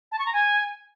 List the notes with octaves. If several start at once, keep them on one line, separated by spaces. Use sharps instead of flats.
A5
C#6
A#5
G#5